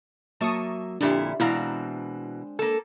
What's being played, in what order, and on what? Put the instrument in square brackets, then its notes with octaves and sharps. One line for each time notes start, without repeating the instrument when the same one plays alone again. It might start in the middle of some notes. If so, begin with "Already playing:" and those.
[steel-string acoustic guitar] F#3 A#3 E5 [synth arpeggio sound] A5 C#6 D#6
[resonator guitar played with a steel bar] F2 A#2 E4 [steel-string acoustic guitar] D3 [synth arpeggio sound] D4 G4
[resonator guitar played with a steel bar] B2 E3 [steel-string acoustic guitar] G#3 C4 D4 [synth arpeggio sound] E4 F5 A#5
[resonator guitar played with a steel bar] A#3 A4